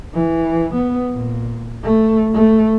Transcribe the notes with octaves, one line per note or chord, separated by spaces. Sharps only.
E3
B3
A#2
A3
A3